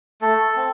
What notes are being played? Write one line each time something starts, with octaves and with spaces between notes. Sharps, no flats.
A3 A4
C4